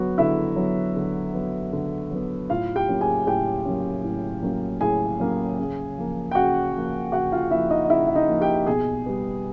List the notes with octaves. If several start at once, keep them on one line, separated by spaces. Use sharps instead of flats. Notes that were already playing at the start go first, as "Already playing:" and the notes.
Already playing: D3 F#3 B3 F#4
D3 E4 E5
F#3 B3
D3
F#3 B3
D3
F#3 B3
A2 F4 F5
G4 G5
F#3 A#3 C#4
G#4 G#5
A2 G4 G5
F#3 A#3 C#4
A2
F#3 A#3 C#4
A2 G#4 G#5
F#3 A#3 C#4
C#3
F3 A#3
G5
C#3 F#4 F#5
F3 A#3
C#3 F#4 F#5
F4 F5
F3 A#3 E4 E5
D#4 D#5
D#5
C#3 E4 E5
E5
D#4 D#5
F3 A#3
G4 G5
B2 G#4 G#5
G3 B3